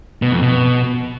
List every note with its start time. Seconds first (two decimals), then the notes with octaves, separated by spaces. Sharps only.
0.22 B2
0.32 F2
0.42 B2